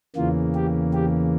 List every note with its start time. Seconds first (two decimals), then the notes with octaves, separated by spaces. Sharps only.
0.16 E2 C#3 E3 A#3 F4
0.55 G4
0.94 G4